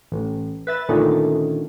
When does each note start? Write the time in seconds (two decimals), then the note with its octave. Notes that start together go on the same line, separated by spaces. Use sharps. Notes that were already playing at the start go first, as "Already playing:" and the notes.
0.12 A1
0.67 B4 E5 A6
0.89 A#2 D3 D#3 A3 C#4